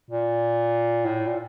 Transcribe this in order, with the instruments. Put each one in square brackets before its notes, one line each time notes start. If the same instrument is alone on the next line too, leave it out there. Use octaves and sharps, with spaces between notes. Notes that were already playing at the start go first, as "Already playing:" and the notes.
[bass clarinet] A#2
A2
A#2